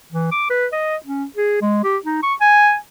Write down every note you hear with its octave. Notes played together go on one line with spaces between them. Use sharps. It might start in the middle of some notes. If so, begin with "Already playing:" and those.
E3
D6
B4
D#5
C#4
G#4
G#3
G4
D#4
C#6
G#5